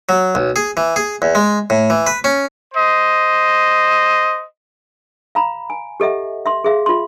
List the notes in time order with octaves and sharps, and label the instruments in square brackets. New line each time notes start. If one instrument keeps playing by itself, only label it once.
[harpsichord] F#3
B1
G#4
E3
G#4
E2
G#3
A2
E3
B4
C#4
[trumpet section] C5 D#5
[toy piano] F5 A#5 B5
G#5
G4 A4 D#5 E5 F#5
E5 C6
G#4 E5 F5
F4 C6